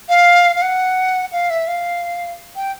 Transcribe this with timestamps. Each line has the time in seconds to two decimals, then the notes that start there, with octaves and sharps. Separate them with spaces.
0.09 F5
0.56 F5
0.62 F#5
1.32 F5
1.50 E5
1.67 F5
2.56 G5